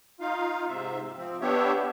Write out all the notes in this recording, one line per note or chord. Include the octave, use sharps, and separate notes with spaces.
D#4 F4 F5
G#2 C3 E5
F3 C4
B3 D4 G4 C#5 E5